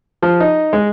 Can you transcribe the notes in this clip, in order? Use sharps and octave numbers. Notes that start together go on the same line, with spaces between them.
F3
D#4
G#3